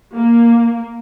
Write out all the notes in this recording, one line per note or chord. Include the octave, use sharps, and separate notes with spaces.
A#3